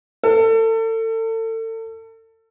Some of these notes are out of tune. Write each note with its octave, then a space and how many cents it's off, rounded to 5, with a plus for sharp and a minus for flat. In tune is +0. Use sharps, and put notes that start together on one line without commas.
A4 +35